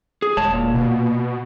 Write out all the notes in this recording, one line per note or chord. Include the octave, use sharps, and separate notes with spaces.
G#4
E1 G#3 C#5 A5
A#2
B2